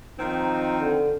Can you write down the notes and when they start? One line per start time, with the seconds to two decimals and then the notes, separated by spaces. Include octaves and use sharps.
0.19 D#3 F3 C4 D#4
0.80 D3